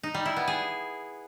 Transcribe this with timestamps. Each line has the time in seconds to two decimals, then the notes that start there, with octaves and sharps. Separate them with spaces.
0.03 D#4
0.14 G3
0.25 E4
0.36 B3
0.48 G#4